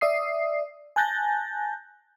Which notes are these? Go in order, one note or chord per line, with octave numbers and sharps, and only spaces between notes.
D5 E5 D#6 C7
G#5 A5 F#6 G6 A6 A#6